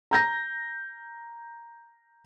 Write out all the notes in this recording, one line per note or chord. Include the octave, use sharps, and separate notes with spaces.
A#5 G6 A#6